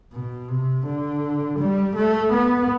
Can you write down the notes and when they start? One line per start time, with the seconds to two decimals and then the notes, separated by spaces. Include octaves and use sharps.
0.12 B2
0.48 C3
0.86 D3
1.59 G3
1.95 A3
2.33 B3